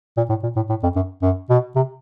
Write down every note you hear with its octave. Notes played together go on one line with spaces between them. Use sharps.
A#2
A2
A#2
A2
A2
F2
F#2
F#2
B2
C3